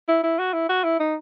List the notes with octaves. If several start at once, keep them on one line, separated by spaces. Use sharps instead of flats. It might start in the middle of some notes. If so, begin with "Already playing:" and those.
E4
E4
F#4
E4
F#4
E4
D#4